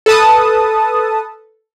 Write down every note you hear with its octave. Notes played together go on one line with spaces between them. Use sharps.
A4 B4 A5 D#6